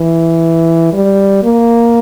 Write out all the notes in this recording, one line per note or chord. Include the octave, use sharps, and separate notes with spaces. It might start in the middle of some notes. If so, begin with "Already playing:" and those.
Already playing: E3
G3
A#3